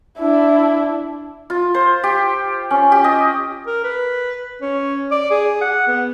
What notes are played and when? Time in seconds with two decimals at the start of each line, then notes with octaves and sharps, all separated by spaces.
0.18 D4 E4
1.50 F4
1.75 C5
2.04 G4
2.71 C#4
2.92 G4
3.04 D#5
3.67 A#4
3.84 B4
4.62 C#4
5.11 D5
5.31 G#4
5.61 F#5
5.88 B3